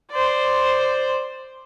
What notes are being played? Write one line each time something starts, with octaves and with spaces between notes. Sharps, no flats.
C5 D5